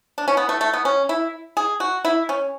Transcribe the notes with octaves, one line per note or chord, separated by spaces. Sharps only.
D4
C#4
B3
A3
A3
B3
C#4
E4
G#4
F#4
E4
C#4